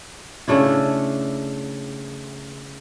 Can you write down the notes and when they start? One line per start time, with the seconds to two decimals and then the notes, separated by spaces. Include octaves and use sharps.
0.48 C#3 A3 D4 E4